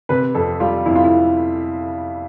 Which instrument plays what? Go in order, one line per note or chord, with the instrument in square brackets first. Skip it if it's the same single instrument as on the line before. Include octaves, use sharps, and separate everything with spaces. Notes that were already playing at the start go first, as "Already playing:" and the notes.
[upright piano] C3 B4
F2 A4
G3 F4
F2 E4
F4
E4